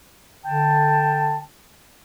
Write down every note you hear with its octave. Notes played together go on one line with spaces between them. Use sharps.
D3 G5 A5